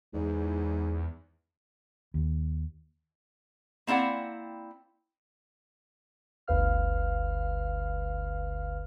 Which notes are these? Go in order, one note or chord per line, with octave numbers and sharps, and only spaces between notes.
E2 G#2
D#2
A#3 C4 E4 D5 F#5
G1 D2 B4 F5 F6